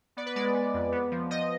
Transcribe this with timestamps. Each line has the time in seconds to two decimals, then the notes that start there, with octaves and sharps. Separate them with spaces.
0.17 B3 D5
0.26 B4
0.36 G#3 D5
0.54 B3
0.74 F2
0.92 B3
1.11 F3
1.31 F3 D#5